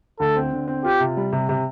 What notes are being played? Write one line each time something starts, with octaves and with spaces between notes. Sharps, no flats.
D2 A4
C4
D3
C4
F4 G4
C3
G3
C3
C3